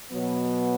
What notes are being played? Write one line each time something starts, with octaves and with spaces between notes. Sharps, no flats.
B2 F#3 B3